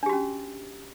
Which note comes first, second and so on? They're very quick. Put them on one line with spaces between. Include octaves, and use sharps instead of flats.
D4 G4 F#4 C#4